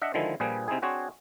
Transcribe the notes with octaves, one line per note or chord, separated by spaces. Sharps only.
D4 D#5 E5 F#5
D3 D#3 F3 G#3 E4
A#1 A#2 F3 G3 G#4 B4
C3 C4 D#4 E4 G#4
C4 D4 F#4 G#4 C5 C#5